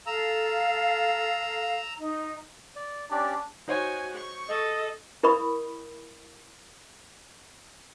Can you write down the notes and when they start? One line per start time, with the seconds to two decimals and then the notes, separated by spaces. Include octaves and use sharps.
0.07 A4 F5 A#5 E6
1.98 D#4
2.76 D5
3.11 C#4 D4 G4 D5
3.68 D#4 F#4 C5 C#5 G#5
4.15 C#6
4.49 A4 D#5
5.23 E4 A#4 D#5 B5 C#6 D#6